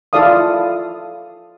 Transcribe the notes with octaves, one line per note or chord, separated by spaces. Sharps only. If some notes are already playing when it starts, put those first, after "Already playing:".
E4 F4 A4 D5 F5 D#6